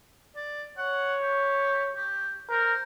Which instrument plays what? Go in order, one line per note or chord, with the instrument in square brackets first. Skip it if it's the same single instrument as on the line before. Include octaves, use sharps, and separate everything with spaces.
[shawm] D5
[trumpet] C#5 [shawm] F#5
[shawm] G4
G4
[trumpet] A#4 [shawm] C5